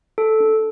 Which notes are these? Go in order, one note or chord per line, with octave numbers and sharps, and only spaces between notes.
A4
D4